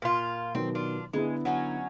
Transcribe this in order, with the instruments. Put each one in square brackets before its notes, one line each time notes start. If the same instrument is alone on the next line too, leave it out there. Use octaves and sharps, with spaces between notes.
[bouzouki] A#2 F4
[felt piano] B2 D#3 F#3 [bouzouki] C4
[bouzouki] D4 F4
[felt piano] D3 B3 E4 [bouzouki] G#3
[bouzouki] F#3 C#4 D#4